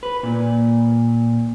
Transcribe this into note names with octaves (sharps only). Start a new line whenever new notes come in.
B4
A#2